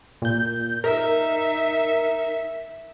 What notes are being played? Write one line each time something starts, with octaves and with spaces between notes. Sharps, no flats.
A#2 G6
D#4 A#4 E5